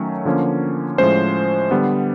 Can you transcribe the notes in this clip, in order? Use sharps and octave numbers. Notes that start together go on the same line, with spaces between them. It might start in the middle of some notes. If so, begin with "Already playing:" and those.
Already playing: D#3 F#3 A3 C#4
D3 F3 A#3 C#4
A2 F3 G#3 C#4 C5
D3 G3 B3